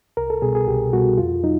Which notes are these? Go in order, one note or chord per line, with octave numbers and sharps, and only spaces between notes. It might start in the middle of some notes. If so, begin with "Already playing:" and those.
C2 A#4
A4
B2 G3 G#4
G#4
C2 G4
B2 G3 F#4
F2 F4
F#3 D#4